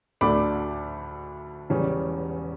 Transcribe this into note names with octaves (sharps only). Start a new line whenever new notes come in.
D2 D3 A3 D4 B5 D6
E1 E2 C#3 G3 C#4